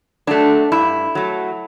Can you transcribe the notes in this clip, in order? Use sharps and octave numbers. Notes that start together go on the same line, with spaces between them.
F#3 A3 D4
G2 E4
F#3 A3